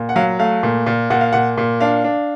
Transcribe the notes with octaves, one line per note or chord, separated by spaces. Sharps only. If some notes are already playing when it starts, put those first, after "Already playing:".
Already playing: A#2
F#5
F#3 F5
A3 F5
A#2
A#2
A#2 F#5
F5
A#2 F#5
A#2
D4 F5
D4